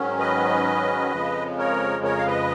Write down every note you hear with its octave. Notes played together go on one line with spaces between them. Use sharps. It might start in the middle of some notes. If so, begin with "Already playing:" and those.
Already playing: G#2 D#3 F#3 C#4
B4 D#5
F2 C#3 F3 G#3
A#4 C#5
A#4 C#5
F5
B4 D#5